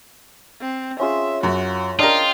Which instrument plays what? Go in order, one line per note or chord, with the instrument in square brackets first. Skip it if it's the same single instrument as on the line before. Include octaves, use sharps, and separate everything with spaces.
[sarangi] C4
[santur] C#4 F4 G#4 [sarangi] E5
[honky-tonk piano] F#2 [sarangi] F#4
[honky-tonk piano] D4 A#4 [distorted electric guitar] F4 [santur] D#5 [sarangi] G5